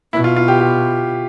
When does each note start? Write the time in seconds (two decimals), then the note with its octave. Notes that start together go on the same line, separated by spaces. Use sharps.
0.13 B2 E4
0.24 F4
0.36 F4
0.48 G4
0.60 G4